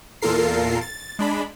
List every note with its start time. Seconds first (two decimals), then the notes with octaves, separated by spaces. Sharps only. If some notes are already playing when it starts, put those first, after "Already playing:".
0.22 E2 A#2 F4 A4 A#4 C7
0.81 A6
1.19 G#3 D4 B5